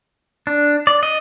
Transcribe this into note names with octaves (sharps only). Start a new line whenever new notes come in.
D4
D5
D#5